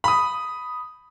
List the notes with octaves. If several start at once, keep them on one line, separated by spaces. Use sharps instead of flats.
B5 D#6